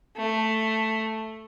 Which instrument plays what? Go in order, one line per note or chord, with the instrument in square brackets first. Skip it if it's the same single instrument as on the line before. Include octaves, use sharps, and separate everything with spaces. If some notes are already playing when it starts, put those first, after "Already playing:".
[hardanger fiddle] A3